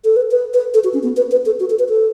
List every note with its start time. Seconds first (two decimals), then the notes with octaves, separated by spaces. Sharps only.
0.05 A4
0.16 B4
0.31 B4
0.54 B4
0.74 A4
0.84 F#4
0.94 C#4
1.03 B3
1.17 B4
1.31 B4
1.46 A4
1.60 F#4
1.70 A4
1.79 B4
1.89 A4